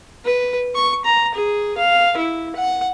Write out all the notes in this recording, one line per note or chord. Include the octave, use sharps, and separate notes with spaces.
B4
C#6
A#5
G#4
F5
E4
F#5